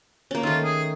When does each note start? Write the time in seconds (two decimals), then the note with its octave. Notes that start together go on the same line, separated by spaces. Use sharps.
0.31 A#3 C#4
0.43 D#3 A3 F4
0.64 G#4